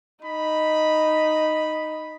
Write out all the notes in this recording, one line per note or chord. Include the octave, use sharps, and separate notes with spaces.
D#4 B5